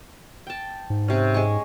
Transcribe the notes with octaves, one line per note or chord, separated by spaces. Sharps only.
G5 A5
G#2
C3 C#4
G#3 G#5 C#6